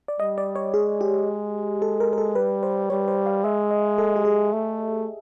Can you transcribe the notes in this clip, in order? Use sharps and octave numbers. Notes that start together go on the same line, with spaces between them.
D5
G3 D#5
D5
C#5
G#3 G#4
G4
A4
A#4
A#4
A4
G3 B4
C5
G3 C#5
C5
F5
G#3 E5
D#5
A4
G4
G#4
A3